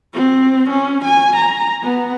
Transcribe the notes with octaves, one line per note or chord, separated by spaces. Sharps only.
C4
C#4
G#5
A#5
B3